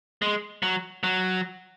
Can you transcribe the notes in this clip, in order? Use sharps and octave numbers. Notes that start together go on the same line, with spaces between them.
G#3
F#3
F#3